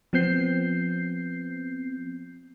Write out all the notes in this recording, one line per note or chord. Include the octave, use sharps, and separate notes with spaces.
F3 B3 C4 G6 C7